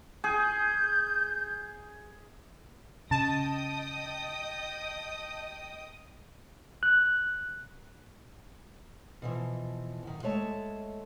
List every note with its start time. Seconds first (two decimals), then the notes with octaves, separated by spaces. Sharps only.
0.24 G#4 G6
3.11 C#3 D#5 G5 A5 D#6
6.83 F#6
9.22 B2 E3 F3
10.03 F#2 D#3
10.23 G#3 A3 C#5 A5